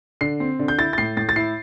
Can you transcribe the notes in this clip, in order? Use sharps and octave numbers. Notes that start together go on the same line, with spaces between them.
D3 C7
C4
D3
G6
E4 A6
A6
A2 C7
A2 A6
A6
E4 C7